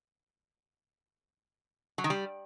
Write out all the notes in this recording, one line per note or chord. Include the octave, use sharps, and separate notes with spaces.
F#3
D#3
G3